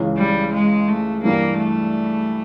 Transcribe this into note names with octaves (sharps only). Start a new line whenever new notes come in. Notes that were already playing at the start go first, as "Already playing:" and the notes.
Already playing: C#2 C#3 E3
G3
G#3
A3
G2 E3 G3 A#3
A3